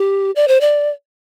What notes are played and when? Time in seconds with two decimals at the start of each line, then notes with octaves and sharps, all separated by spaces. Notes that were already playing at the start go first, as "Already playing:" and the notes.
Already playing: G4
0.36 D5
0.48 C5
0.61 D5